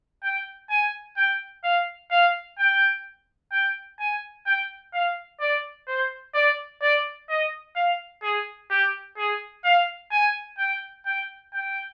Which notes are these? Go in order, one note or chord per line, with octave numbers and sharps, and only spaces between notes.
G5
G#5
G5
F5
F5
G5
G5
G#5
G5
F5
D5
C5
D5
D5
D#5
F5
G#4
G4
G#4
F5
G#5
G5
G5
G5